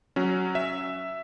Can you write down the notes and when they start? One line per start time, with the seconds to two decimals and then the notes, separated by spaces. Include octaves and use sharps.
0.16 F#3 C#4
0.55 E5